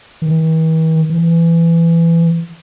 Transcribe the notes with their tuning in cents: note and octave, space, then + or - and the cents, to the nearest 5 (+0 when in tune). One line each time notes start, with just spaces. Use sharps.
E3 -45
E3 +20